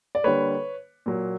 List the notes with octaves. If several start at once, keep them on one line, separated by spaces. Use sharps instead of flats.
D5
D3 G3 A#3 B4 C#5
A#2 F#3 A#3